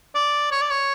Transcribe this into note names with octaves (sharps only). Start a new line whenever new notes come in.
D5
C#5
D5
C#5